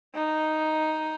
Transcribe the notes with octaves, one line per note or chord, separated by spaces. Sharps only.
D#4